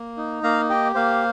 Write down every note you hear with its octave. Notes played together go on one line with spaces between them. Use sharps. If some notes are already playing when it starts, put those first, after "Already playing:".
Already playing: A#3
D#4
A#3 F5 A#5
G4 D#5 G5
A#3 C5 F5